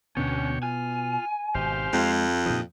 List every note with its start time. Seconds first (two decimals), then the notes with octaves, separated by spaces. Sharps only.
0.17 D2 B2 B3 C#4 D4 C#5 G5
0.63 F4 G#5
1.55 G#1 B2 G4 C5 F5
1.93 F2 G#3
2.46 A#2 C#3 F3 D#4 G4